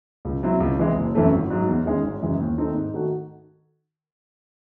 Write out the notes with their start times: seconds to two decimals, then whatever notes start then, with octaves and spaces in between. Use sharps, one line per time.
0.25 C#2
0.42 C3 F#3 C4 E4
0.60 C#2
0.79 C3 E3 G#3
0.96 F#1
1.15 F#2 E3 A3 C4
1.32 G#1
1.50 G#2 F#3
1.68 E2
1.86 D#3 G#3 C#4 G#4
2.04 G#1
2.22 F#2 C#3 E3 G#3
2.40 D#2
2.58 D#3 A3 C4 D#4
2.76 G#2
2.94 D#3 A3 D#4 F#4